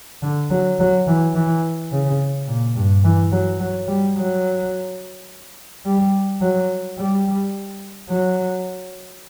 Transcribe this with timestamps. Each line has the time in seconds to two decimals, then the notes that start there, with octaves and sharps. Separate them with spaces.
0.22 D3
0.50 F#3
0.80 F#3
1.07 E3
1.35 E3
1.92 C#3
2.48 A#2
2.76 G2
3.04 E3
3.32 F#3
3.60 F#3
3.88 G3
4.17 F#3
5.86 G3
6.41 F#3
6.98 G3
8.10 F#3